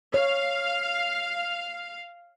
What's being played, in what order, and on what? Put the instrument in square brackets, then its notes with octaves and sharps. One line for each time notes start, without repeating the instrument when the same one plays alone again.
[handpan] C#5 [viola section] F5